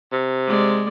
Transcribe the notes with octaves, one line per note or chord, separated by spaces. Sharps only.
C3
G#3 D5